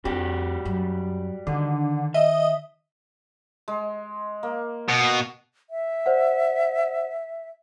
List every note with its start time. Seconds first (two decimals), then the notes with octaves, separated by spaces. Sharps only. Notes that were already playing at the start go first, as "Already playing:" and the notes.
0.05 F2 G3 D4 F#4 G4
0.65 F#2
1.47 D3 D#3
2.14 D#5 E5
3.68 G#3
4.43 A#3
4.89 B2
5.70 E5
6.06 C5 D5 F#5